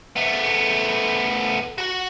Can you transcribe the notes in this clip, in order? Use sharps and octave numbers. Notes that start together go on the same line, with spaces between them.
A3 B3
F#4 F#5